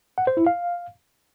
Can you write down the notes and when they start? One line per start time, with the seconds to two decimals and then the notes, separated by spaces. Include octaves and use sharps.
0.18 F#5
0.27 C5
0.37 E4
0.47 F5